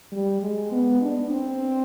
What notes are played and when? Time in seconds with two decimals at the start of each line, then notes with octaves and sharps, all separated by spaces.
0.12 G3
0.42 G#3
0.72 B3
1.02 D4
1.31 C4